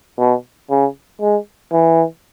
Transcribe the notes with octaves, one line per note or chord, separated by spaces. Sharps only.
B2
C#3
G#3
E3